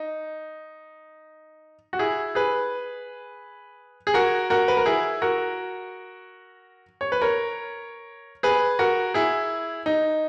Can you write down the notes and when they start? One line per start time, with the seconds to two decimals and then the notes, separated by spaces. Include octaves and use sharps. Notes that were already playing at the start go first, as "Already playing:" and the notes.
Already playing: D#4
1.93 F#4
1.99 E4 G#4
2.35 G#4 B4
4.07 G#4
4.14 F#4 A#4
4.50 F#4 A#4
4.68 B4
4.77 A#4
4.86 E4 G#4
5.22 F#4 A#4
7.01 C#5
7.12 B4
7.22 A#4 C#5
8.43 G#4 B4
8.79 F#4 A#4
9.14 E4 G#4
9.86 D#4